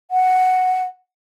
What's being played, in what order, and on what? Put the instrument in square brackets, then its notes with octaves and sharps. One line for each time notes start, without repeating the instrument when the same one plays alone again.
[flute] F#5